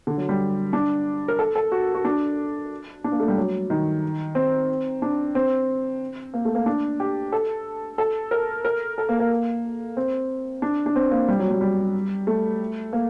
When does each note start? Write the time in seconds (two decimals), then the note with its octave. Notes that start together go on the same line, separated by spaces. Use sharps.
0.07 D3
0.18 F#3
0.29 G3
0.73 D4
1.28 A#4
1.39 A4
1.56 A4
1.72 F#4
1.95 F#4
2.05 D4
3.04 D4
3.12 A#3
3.20 A3
3.28 G3
3.37 F#3
3.70 D#3
4.35 C4
5.02 D4
5.35 C4
6.34 A#3
6.45 A3
6.55 A#3
6.66 D4
7.00 G4
7.32 A4
7.98 A4
8.31 A#4
8.65 A#4
8.98 A4
9.09 A#3
9.20 A#3
9.97 C4
10.62 D4
10.86 D4
10.96 C4
11.11 A#3
11.28 G3
11.39 F#3
11.51 G3
11.61 G3
12.27 A3
12.93 A#3